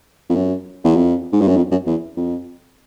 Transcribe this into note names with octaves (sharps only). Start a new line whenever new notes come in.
F2
F#2
E2
F2
G#2
G2
F#2
F2
F#2
E2
F2